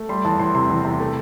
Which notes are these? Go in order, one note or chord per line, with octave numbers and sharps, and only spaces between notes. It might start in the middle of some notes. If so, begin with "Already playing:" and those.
Already playing: A3
G3 C6
E2 A5
E2 C6
C3 C6
E2
C3
A3